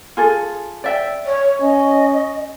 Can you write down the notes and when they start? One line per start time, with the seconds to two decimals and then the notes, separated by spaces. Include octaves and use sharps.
0.17 F4 G#4 A4
0.84 D5 E5 G5
1.26 C#5
1.61 C#4 D#5